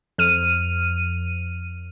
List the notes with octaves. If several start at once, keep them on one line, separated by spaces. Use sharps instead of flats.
F2 F6 D#7